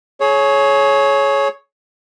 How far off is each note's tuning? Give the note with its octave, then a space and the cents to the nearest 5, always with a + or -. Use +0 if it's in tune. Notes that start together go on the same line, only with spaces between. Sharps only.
G#4 +30 C#5 +0